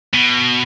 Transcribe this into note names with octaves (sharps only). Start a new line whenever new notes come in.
B2